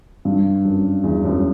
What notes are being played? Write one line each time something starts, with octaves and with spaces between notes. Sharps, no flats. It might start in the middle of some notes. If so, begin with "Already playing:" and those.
G2
F#2
E2
F#2